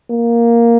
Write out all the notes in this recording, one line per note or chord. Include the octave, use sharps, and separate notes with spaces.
A#3